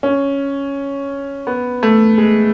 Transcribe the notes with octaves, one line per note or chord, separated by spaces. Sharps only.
C#4
B3
A3
G#3